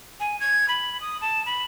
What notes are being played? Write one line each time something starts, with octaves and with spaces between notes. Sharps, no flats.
G#5
G#6
B5
D#6
A5
B5